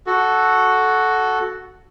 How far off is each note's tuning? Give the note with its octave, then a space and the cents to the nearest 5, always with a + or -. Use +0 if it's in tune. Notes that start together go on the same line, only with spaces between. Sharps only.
F#4 +0 A4 -10